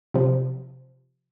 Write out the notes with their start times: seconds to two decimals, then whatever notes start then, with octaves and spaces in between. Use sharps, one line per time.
0.14 C3 F3